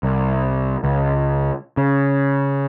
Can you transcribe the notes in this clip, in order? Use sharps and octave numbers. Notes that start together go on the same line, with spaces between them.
C2
C#2
C#3